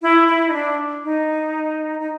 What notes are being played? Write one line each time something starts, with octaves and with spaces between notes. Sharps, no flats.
E4
E4
D#4
D4
D#4
D#4